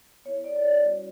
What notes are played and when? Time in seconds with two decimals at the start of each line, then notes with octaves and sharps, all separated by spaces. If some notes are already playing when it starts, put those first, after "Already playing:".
0.25 B3 E4 C#5
0.44 D5
0.56 D5
0.64 C#5
0.84 G3 C#4 F#4